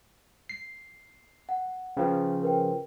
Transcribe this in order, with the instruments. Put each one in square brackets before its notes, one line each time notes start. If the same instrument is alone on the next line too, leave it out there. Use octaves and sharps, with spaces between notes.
[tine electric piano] C7
[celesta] F#5
[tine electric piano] C#3 F3 [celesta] B4 C5 G5
[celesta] A#4 B4 G5